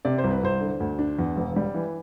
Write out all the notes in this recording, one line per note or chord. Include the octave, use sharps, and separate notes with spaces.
C3 D5
C5
C2
B4
C2 C5
D3
D2
D4
E2
E1
G3
E3